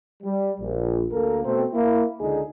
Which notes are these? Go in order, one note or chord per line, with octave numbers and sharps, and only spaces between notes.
G3
A#1
D2 A#3 A4 A#4
B2 A3 C4
A#3 E4
C#2 D3 D#4 G#4